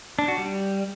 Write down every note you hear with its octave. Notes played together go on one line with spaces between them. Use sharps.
D4
F#4
G3